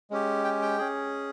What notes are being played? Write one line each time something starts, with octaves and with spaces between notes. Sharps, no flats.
G#3 C#4 G4
G5
G5
C#4 G#4